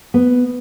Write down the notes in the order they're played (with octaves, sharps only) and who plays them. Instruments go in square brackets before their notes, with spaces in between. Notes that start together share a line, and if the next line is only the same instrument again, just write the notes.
[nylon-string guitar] B3